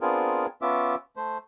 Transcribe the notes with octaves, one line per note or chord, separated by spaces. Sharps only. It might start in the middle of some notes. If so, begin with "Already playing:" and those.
B3 C4 D4 F4 G#4 A#4
B3 C#4 F4 E5 D6
A3 C5